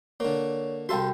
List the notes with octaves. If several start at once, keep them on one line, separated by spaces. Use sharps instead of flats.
D3 A#3 C#5
C2 F#4 A4 F5 G5 C6